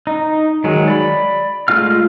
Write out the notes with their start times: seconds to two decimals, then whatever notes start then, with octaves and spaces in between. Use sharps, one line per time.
0.07 D#4
0.64 D#3 F#3 G#3
0.88 D5 B5
1.68 G#3 A3 F4 F5 F6